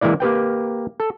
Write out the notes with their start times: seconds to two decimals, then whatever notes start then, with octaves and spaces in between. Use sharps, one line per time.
0.01 E3 G#3 A#3 E4 D5
0.20 A#3 G4 B4 G5
1.00 A4